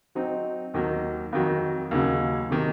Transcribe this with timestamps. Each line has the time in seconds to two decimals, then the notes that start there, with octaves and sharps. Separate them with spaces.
0.15 F#3 C4 D#4
0.74 D#2 D#3 F#3 A#3
1.33 F2 D#3 F#3
1.91 D#2 C#3 F#3
2.50 C3 D#3 A#3